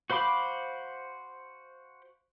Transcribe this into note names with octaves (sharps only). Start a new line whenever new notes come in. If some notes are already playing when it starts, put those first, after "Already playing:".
F#4 C5 F5 B5 D6